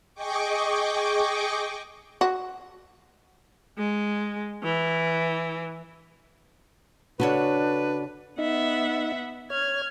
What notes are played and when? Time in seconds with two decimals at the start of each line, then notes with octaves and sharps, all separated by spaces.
0.14 G#4 D#5 G5 C#6 D6
2.21 F#4
3.78 G#3
4.63 E3
7.20 C#3 D4 F#4 A4 B4 C#5
8.38 B3 D#4 E5 F#5
9.50 C#5 F6 G#6